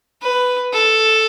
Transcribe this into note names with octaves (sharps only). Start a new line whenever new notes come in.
B4
A4